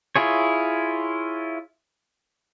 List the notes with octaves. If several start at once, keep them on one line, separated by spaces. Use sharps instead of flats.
E4 F4 G#4 C#5